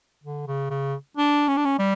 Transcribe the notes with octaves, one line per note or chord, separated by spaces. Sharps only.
D3
C#3
C#3
D4
C#4
D4
C#4
G3